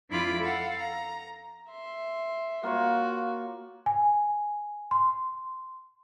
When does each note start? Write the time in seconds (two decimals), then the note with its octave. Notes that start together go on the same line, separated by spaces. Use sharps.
0.10 F2 D4 E4 F4 B5 D6
0.41 A4 F5 F#5
0.79 A#5
1.69 E5 C6
2.63 A#3 F4 F#4 C#5
3.86 G#5
4.91 C6